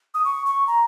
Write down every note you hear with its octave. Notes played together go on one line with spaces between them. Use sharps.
D#6
C#6
C#6
A#5